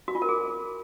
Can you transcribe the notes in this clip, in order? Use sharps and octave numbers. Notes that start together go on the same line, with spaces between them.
F#4
F4
A#4
G#4